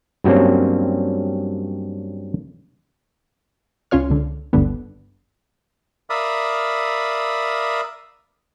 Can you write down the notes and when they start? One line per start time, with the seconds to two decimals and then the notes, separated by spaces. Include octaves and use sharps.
0.24 G2 F#3 G3 A#3 C4 C#4
3.91 C#2 C#4 F4 C#5 F6
4.10 C#2 D3
4.53 G1 D2 G2 D3 B3
6.10 A#4 D5 E5 F5 B5 D#6